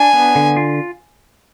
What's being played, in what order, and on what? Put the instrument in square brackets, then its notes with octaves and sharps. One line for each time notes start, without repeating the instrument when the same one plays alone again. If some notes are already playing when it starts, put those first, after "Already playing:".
Already playing: [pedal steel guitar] D4 [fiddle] G#5
[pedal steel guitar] B3
D3
F4